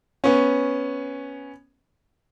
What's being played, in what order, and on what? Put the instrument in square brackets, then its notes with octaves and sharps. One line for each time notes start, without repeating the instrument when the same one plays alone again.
[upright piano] B3 C#4